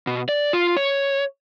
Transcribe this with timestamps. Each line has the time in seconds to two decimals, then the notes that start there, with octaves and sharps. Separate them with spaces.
0.07 B2
0.29 D5
0.53 F4
0.77 C#5